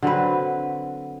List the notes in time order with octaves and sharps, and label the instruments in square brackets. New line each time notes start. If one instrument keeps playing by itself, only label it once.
[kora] D3 F#3 C4 B4